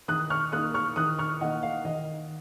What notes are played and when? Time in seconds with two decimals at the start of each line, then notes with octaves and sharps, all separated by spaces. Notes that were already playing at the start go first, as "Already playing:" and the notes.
0.08 D#3 D#6 F#6
0.30 C#6 F6
0.52 A#3 D#4 D#6 F#6
0.74 C#6 F6
0.96 D#3 D#6 F#6
1.19 C#6 F6
1.41 A#3 D#4 D#5 F#5
1.63 F5
1.85 D#3 D#5